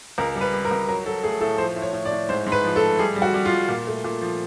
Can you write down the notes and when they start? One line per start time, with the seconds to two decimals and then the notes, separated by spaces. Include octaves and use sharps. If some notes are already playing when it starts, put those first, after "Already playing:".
0.18 C#2 A#4
0.35 G3
0.41 B4
0.53 G3
0.65 A#4
0.71 C#2
0.88 F#3 A#4
1.06 F#3 A4
1.23 A3 G#4
1.41 A2 A4
1.58 F3 C5
1.76 A2
1.82 C#5
1.93 A2
2.05 D5
2.11 A2
2.29 G#2 C5
2.46 G#2
2.52 B4
2.64 F3
2.76 A4
2.81 A3
2.99 G3 G#4
3.16 G3
3.22 F#4
3.34 G3
3.45 F4
3.51 G3
3.68 A#2
3.87 A3
4.04 A#2
4.21 F3